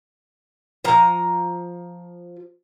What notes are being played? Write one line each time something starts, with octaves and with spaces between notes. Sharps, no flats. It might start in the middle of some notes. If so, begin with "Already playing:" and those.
F3 A#5